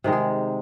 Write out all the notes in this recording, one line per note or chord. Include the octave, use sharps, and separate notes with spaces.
C3 D#3 G#3
G#4